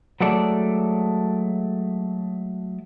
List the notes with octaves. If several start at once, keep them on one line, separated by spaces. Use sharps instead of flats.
F#3 G#3 A3 A4 D5